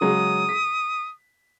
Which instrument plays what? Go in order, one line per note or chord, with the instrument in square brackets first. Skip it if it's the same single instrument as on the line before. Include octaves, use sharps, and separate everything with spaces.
[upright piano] C#3 F#3 G#3 [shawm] D#6
[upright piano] B6